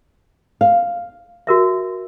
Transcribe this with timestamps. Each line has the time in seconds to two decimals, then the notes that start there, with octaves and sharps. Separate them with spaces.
0.61 F5
1.47 F#4 A#4 E5